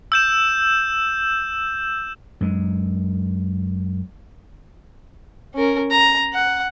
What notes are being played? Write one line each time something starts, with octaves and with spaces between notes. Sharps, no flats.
E6 G6 E7
F#2 G#3
C#4 A#4
A#5
F#5